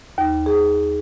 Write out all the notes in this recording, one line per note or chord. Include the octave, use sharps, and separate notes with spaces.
D#2
G#4